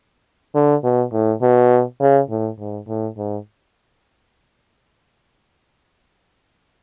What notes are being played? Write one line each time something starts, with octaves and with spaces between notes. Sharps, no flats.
D3
B2
A2
B2
C#3
A2
G#2
A2
G#2